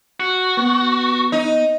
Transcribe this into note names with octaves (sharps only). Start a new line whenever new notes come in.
F#4
B3
D#4